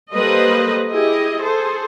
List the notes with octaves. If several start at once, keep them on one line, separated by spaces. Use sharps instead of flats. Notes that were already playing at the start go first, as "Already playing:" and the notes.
G3 A#3 A4 B4 C5 D#5
E4 G4 G#4 D#5
G#4 A4 C5